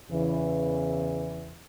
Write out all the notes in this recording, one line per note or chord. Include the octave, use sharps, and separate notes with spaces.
E2 C#3 E3